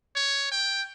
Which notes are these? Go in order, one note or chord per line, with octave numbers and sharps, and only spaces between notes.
C#5
G5